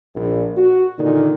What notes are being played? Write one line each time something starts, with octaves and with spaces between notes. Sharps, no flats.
A#1
F#4
A#2 D3 D#3